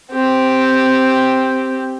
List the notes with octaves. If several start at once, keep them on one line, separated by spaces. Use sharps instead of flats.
C4 G4